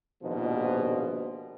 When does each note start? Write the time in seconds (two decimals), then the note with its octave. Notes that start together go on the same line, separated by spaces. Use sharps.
0.23 A#1 D#2 G#2 B2 F3